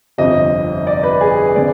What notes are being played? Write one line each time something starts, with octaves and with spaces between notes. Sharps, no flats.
G1 F2 C3 D#5
D5
B4
G#4
D3 G#3 C4 D5